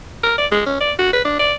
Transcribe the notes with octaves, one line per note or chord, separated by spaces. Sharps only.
A#4
D5
G#3
C#4
D5
F#4
B4
D4
D5